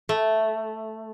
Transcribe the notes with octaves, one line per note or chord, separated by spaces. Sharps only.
A3